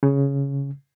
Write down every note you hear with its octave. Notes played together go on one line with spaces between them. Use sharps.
C#3